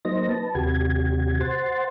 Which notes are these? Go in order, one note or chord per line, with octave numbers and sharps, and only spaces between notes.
F#3 A#3 D#4 C5 D#5 A#6
B4 A5
D#2 C3 F#4 G4 G#6
C5 F#5 C6 A6